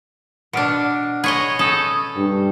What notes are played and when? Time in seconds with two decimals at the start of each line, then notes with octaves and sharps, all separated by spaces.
0.53 B2 D4 F6 D7
1.24 G#4 C#5 D#5 B5 C#6
1.59 C#4 A4 D#6 G6
2.16 G2